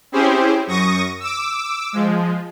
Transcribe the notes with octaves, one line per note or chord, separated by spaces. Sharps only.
C4 C#4 E4 G4 G#4 C5
F#2 C#6 D#6 A#6
D6 E6
F3 G#3